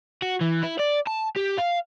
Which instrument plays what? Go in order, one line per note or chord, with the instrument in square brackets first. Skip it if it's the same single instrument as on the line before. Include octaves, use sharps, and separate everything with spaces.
[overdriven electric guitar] F#4
E3
E4
D5
A5
G4
F5